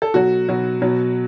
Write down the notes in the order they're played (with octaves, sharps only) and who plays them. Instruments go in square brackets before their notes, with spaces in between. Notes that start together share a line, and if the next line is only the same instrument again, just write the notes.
[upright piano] A4
B2 F#3 F#4
B2 F#3
B2 F#3